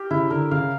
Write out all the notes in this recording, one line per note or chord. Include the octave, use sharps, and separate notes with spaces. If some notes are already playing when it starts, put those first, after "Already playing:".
Already playing: G4 A#4
C#3 E4
D3 A#4
C#3 F5